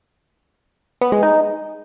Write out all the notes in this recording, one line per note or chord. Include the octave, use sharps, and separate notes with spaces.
B3
G#3
D#4